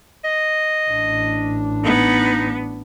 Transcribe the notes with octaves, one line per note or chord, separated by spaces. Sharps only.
D#5
A1 D4
B3 D#4